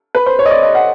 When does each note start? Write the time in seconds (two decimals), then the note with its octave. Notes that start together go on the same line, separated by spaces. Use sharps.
0.15 B4
0.26 C5
0.39 C#5
0.46 D#5
0.51 D5
0.63 D#5
0.75 F#5